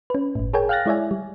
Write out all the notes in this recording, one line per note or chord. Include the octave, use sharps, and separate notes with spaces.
C#4 B4
G1 A2
G#4 A#4 C#5 G5 G#5
F5 G5 F6 F#6 A6 A#6
G#3 E4 C#5 D5 E5 G#5
G3